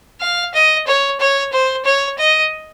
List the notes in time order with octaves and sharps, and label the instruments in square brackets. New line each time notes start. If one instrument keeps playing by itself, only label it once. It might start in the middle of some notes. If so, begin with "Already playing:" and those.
[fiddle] F5
D#5
C#5
C#5
C5
C#5
D#5